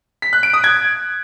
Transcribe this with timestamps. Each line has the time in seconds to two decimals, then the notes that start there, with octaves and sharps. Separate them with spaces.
0.22 B6
0.33 F#6
0.43 D7
0.54 D#6
0.64 G#6